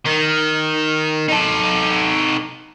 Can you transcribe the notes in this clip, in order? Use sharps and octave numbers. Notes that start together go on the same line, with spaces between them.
D#3
D#4 A4